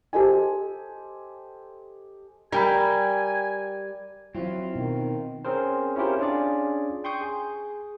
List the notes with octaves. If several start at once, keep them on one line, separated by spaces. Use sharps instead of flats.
G4 A4 C5 D#5 G#5
G3 A#4 G5 G#5 B5
F#3 C4 E4 F4
B2 D#3
C4 C#4 G#4 A#4 C5
C#4 E4 F4 G4 A#4 C5
C#4 D4 F4 G#4 D5
G5 C6 C#6 D#6 G6
G#4